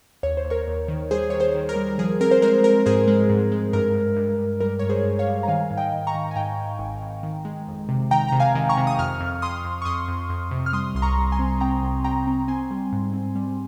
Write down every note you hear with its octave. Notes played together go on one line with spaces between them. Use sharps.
D#2 C#5
C5
D#2
A#4 C#5
D#2
D#3
G3 G#4 C5
D#3 C#5
G#4 C5
D#3
A#4
G3
F3 G#4
C4 A#4
C5
G#3 A#4
G#3 A#4
G#2 G#4 C5
G#3
G#2
G#3
G2 A#4
G2
G2
G2
G3 A#4
G2 C#5
G#4 C5
G2
C#5 F5
G3
A#5
D#3 F5 G#5
G#2
D#5 G5
D#3
A#5 C#6
D#3
G#5
G#2 G5 A#5
G#2
G#1
G#1
D#3
G#3
F2
C3
D#3 G5 A#5
C3 A#5
F5 G#5
D#3
A#5 C#6
C3
D#6
F2 C#6 F6
F2
F2 C6 D#6
F2
C#6
F2 C6 D#6
F2
F2
C3
F6
G3 C6 D#6
C2 C6
A#5 C#6
G3
G#5 C6
C4
C4 G5 A#5
C2
G3 G5 A#5
C4
C4 G#5 C6
G3
G#2
C4
G3